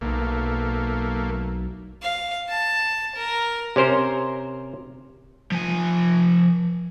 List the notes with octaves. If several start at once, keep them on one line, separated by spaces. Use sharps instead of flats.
B1 A3 A#3
F5
A5
A#4
C3 C#4 A#4 C5
F3 G#5